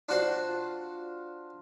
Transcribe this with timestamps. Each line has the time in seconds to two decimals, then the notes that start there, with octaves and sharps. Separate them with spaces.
0.09 D4 F4 F#4 C5